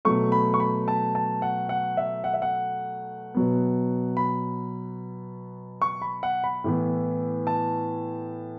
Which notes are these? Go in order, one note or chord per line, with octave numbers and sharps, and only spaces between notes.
B2 F#3 A3 C#6
B5
C#6
B5
A5
A5
F#5
F#5
E5
F#5
E5
F#5
B2 F#3 B3
B5
C#6
B5
F#5
B5
A2 E3 B3
A5